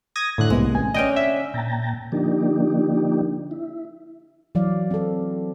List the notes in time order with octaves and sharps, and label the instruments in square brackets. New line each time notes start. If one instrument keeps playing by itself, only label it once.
[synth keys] D#6 G#6 A#6
A2 D3 F#6
[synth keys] C2 [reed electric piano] C3 A#3 B3 [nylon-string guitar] G#3
[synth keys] A1 [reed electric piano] G#5
[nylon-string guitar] D3 C#4 [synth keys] D#5 G5
[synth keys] E5
[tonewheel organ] A#2 G5 A5 A#5
D3 F3 A#3 D4 D#4 G4
E4
[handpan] E3 F#3 D5 F5
C4 A4